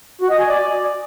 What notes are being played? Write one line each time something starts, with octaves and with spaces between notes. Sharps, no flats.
F#4
D#5
G#5
D5